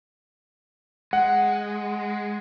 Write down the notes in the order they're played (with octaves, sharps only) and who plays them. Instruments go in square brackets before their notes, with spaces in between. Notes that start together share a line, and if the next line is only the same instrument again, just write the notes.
[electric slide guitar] G#3 [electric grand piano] F#5